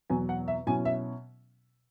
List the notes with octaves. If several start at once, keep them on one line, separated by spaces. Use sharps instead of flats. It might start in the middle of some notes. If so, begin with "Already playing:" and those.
E2 B2 F#3 G#5
F#5
E5
B2 F#3 C#4 E4 G#5
E5